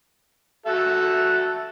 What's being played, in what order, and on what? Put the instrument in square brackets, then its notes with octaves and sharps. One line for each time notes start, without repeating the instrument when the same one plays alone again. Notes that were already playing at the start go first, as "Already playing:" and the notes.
[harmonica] F#4 A4 E5